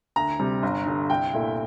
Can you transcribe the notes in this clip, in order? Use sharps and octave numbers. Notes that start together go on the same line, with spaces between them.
D2 A#5
C3 G3
G1
G2 D3
C2 G5
A#2 A3 E4